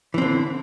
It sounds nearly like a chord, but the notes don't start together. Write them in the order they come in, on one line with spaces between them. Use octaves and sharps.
E3 C4 D3